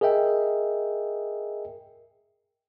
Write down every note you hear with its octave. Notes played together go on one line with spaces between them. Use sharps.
G#4 A#4 D#5 E5 G5